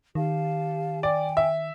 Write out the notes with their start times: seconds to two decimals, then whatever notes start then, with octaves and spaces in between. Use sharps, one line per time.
0.15 D#3 G4 F5 A5
1.03 D5 G5 G#5
1.37 E5